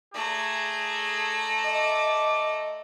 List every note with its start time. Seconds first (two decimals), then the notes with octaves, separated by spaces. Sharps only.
0.14 A3 G#4 D5 A#5
1.64 D#5 D6